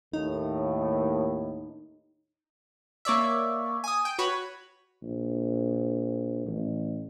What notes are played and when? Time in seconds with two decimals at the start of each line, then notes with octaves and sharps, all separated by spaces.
0.13 D#2 A2 D#4
3.05 A#3 C#5 D5 E5
3.84 G#5 D#6
4.05 G5
4.19 F#4 B4 C#5 B5
5.03 A#1
6.46 A1